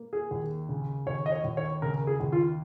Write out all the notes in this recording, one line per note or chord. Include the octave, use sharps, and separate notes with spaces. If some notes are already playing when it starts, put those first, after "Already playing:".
Already playing: A#3
G#4
D#2
C#3
D#2 C#5
D#5
C#5
D#2
C#5
C#3 A#4
G#4
D#2
F4